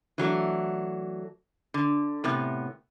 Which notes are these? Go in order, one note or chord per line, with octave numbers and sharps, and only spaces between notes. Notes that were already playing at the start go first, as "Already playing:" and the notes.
E3 F#3 A3 D4
D3
A2 C3 B3